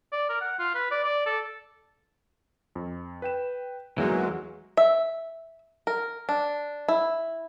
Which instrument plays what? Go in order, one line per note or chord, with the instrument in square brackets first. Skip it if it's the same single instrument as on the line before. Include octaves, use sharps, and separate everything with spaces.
[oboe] D5
A#4
F#5
F4
B4
D5
D5
A4
[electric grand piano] F2
B4 G5 E7
[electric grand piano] E2 D#5 [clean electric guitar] E3 A#3 D#4 [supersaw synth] F#3 [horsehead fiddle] G#3
[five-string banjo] E5
A#4
D4
E4